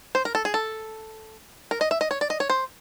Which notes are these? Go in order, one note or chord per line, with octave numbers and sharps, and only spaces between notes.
C5
A#4
A4
G#4
A4
A#4
D#5
E5
D#5
C#5
D5
D#5
C#5
C5